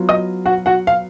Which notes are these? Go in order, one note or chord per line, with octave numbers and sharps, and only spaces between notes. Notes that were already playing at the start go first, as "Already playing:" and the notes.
Already playing: F#3 B3 F4
D#5 D#6
F#4 F#5
F#4 F#5
F5